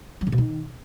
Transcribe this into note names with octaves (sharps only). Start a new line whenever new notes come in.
F#3
C#3
B2
D#3